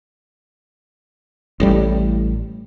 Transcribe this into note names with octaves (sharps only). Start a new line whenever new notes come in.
A1 A2 G3